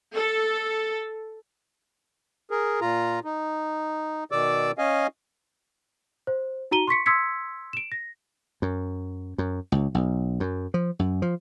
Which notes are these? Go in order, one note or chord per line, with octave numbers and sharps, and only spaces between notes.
A4
G#4 A#4
A#2 F4 A#5
D#4
B2 D#3 D5 D6 E6
C#4 D#5 F5 G#5
C5
D#4 F#4 A#5 D#7 G7
C6 C#6 B6 C#7
C6 D#6 E6 G#6 B6 C#7
D7 E7
A#6
F#2
F#2
C#2
B1
F#2
F3
F#2
F3